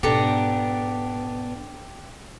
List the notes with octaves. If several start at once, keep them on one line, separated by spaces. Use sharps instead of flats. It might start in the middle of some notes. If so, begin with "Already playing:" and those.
G#2 B2 B3 D4 G4 A4 A#5